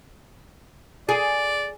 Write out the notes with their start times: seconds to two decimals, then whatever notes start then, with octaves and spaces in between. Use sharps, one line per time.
1.09 G#4 D5